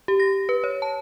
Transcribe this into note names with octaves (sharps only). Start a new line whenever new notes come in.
G4
A#6
B4
C#5
A5